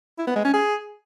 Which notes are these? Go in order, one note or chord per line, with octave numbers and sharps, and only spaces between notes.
E4
B3
G#3
C#4
G#4